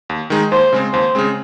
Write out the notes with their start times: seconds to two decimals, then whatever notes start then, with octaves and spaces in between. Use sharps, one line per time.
0.09 D#2
0.30 D#3 G#3 D#4
0.52 D#2 C5
0.73 C#3 G#3 C4
0.93 D#2 C5
1.15 C#3 G#3 C4